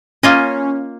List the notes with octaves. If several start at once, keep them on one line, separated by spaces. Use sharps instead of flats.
A#3 C#4 F4 D#5